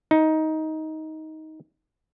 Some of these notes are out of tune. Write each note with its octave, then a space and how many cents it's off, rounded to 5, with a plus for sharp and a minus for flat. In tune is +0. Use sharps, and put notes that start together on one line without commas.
D#4 +15